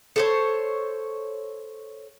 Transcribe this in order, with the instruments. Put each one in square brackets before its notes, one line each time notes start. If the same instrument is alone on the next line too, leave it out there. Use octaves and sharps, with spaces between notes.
[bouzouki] A4 C5 C#5